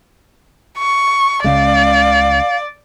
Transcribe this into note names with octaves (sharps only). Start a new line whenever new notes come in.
C#6
C#2 C#3 G#3 D5 F5